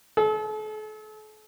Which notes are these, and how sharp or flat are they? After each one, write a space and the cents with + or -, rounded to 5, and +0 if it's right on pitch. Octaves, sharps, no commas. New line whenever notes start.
A4 -40